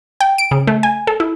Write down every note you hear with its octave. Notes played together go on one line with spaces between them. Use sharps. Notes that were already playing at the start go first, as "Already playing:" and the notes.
G5
D7
C#3
A3
G#5
A4
E4